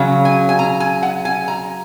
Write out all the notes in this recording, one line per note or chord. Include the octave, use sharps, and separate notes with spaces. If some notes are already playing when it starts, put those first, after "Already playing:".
Already playing: C#3 F#3
G#5
G#5
A#5
G#5
F#5
G#5
A#5